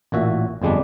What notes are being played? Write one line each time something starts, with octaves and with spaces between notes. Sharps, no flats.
A1 A#2 F#4 E5
G1 F2 G3 G#3 D4